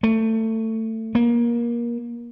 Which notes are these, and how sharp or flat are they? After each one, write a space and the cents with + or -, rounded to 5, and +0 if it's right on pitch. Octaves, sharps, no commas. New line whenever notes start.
A3 +20
A#3 +25